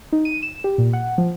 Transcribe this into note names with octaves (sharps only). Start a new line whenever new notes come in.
D#4
D#7
E7
G4
A#2
F#5
F3